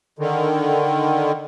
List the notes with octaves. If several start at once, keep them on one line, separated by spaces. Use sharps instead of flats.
D3 D#3